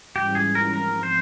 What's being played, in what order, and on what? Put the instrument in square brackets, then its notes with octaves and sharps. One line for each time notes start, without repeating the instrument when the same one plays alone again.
[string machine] G#2 E3 G3 C#4 F4 [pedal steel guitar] G4
[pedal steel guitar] G#4
A#4
[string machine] G#2 F3 C4 [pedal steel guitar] A#4
[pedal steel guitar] C5